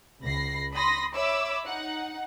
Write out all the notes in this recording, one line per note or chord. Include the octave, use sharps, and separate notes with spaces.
C#2 B5 A#6 C7
B5 C6 D#6 A#6
C#5 E5 B5 D6 E6
D#4 F#5